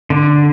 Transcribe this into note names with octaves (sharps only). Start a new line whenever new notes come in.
D3